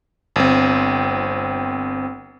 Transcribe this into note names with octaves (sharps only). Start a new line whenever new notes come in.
G1 C4